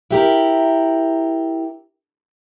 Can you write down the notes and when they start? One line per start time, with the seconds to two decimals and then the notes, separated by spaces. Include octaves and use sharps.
0.11 E4 G4 A#4